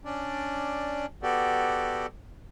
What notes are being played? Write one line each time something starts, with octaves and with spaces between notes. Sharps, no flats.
C#4 D4 D5
B3 F#4 G4 A4 D5